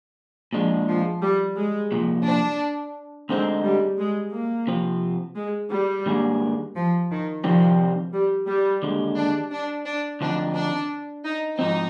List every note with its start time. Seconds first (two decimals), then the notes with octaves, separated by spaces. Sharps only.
0.53 A#2 F3 G#3 D4
0.88 F3
1.22 G3
1.56 G#3
1.92 C2 A#2 F3
2.25 D4
3.29 D2 D3 G#3 C4 D#4
3.63 G3
3.99 G#3
4.34 A#3
4.67 C3 F3 C4
5.36 G#3
5.71 G3
6.06 G#2 D#3 A#3 D4 G#4
6.76 F3
7.10 D#3
7.44 C2 C3 D#3 F3 G3 C4
8.13 G3
8.47 G3
8.83 D#2 D3 G#3
9.17 D4
9.52 D4
9.86 D4
10.21 D2 D3 F3 C4 D4 D#4
10.55 D4
11.25 D#4
11.59 G#2 F3 C4 D#4